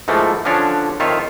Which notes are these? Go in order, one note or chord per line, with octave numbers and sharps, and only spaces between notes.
G#2 E3 F3 A3 A#3
D3 F3 C#4 D4 C#5
F2 D#3 F4 C#5 E5